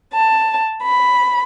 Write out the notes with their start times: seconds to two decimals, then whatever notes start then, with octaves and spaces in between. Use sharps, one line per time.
0.12 A5
0.84 B5